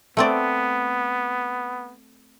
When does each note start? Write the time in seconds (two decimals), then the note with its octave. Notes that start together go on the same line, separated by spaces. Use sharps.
0.17 A3 B3 C4 D5